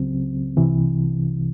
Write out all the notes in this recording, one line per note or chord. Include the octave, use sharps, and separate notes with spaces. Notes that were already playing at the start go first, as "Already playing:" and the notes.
Already playing: C#2 C#3 F#3 C4
C2 C3 E3